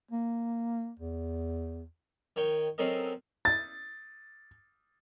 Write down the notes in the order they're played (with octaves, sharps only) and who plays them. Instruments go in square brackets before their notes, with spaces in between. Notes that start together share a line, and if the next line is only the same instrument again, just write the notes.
[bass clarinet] A#3
E2
[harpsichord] D#3 C#5 G5
F#3 C4 C#4 A4 A#4 D#5
[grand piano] A6